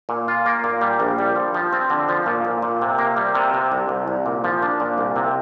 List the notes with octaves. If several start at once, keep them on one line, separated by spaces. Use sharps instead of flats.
A#2
F4
A#3
A#2
G3
A#1
G3
F3
F3
C4
D3
F3
A#2
A#2
A#2
C3
A#3
G3
C3
C3
C2
C2
C2
A#2
F3
D4
A#2
C2
C3